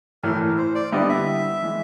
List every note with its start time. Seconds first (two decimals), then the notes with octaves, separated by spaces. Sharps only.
0.23 A2 E3 A3 A#4
0.58 C5
0.75 D5
0.92 D3 G3 B3 E4 D#5
1.09 E5
1.62 E3 G#3